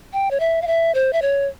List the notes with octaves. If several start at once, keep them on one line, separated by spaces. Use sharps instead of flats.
G5
C#5
E5
F5
E5
C5
E5
C#5